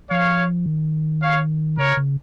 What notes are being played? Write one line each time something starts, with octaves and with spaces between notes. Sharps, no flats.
F3 C#5 F5
D#3
C#5 F5
C#3 A#4 C#5
C#3